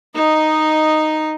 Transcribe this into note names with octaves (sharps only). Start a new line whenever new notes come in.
D#4 D#5